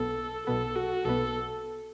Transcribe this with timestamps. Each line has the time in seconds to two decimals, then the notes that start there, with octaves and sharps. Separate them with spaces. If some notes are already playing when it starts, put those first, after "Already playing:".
Already playing: B1 B2 B3 A4
0.47 B1 B2 B3 A4
0.76 F#4
1.05 B1 B2 B3 A4